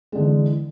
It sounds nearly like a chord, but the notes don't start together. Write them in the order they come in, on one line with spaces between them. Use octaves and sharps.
G#3 D3 E3